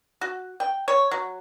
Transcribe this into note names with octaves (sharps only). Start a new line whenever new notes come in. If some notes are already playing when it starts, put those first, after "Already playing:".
F#4
G5
C#5
F#3